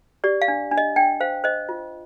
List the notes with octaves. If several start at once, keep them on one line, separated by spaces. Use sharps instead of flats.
G4 D5
F5
D4
D4
D#5
D4 G5
C5 F5
C5 D#5
F4